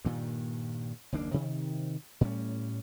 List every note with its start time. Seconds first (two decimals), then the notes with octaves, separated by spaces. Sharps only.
0.05 G2 A#2 D#3
1.12 F#1 D#2 A#3 D4
1.34 C3 D#3
2.21 A2 G3 C#4